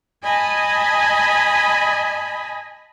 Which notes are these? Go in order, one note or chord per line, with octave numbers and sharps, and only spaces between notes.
D#5 G#5 A5 B5